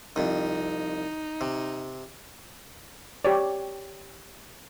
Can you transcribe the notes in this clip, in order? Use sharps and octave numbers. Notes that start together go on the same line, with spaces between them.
C2 F2 D#4
C3
G4 C#5 D5